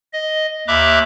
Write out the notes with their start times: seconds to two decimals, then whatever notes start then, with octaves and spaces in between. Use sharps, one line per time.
0.13 D#5
0.68 D#2 E5 A#5 B5 D6 F#6